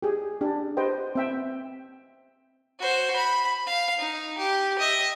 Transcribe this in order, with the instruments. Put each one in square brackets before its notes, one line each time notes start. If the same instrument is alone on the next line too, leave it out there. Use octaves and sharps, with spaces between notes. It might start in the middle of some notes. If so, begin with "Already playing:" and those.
[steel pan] G4 G#4
D4 G4
G4 B4 C5 D#5 G5
C4 E5 G5
[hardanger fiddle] F#4 C5
B5
F5
D#4
G4
D#5 E5